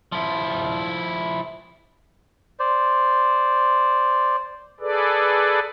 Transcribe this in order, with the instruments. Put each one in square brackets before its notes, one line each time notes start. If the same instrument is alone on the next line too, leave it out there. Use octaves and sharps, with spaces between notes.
[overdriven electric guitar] F3 E4
[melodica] C5 D5
[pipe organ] G#4 A4 B4 D5